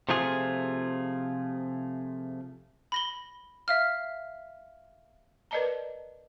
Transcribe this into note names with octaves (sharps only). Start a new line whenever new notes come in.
C3 F3 A3 F4 G#4
B5 A#6 G7
E5 F5 F6
A#4 B4 D5 D#5 A5 A#5